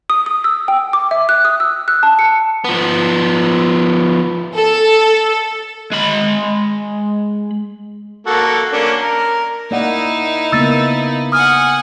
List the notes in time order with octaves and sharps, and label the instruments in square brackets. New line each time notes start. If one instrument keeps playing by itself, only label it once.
[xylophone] D#6
D#6
E6
G5
D6
E5
F#6
D#6
E6
F#6
A5
C#7
[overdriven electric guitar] F3 B3
[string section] A4
[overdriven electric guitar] G#3 B5
[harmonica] A#3 F#4 A4
A#3 C#4 D4
A#4
[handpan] A#3 D5 F#5 [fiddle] D#4 E4
[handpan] C#3 A#3 B3 [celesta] E6 A6
[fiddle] F#5 G#5 [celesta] D#6 F6